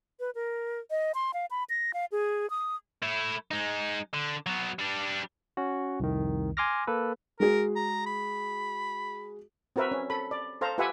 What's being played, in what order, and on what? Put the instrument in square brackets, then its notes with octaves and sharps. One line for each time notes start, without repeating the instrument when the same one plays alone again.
[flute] B4
A#4
D#5
C6
F5
B5
A#6
F5
G#4
D#6
[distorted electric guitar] A3 E4
G#3 D#4
D3
F#3 B3
G3 D4
[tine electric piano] C#4 F#4
C2 F2 D#3
G#5 C6 D6 F6 A#6
A#3 A4 B4
[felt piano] G#3 F#4 G#4 [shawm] A#4
[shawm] A#5
B5
[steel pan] C4 F#4 A#4 B4 E5
C#4
A4 B5
D5
A4 C5 F5 A#5
F4 G4 B4 E5 F#5 G#5